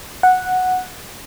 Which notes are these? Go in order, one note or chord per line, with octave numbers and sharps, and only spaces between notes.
F#5